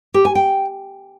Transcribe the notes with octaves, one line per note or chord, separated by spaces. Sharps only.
G4
G#5
G5